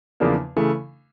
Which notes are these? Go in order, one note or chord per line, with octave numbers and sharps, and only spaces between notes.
E2 C#3 F3 A#3 D4
C#3 E3 A3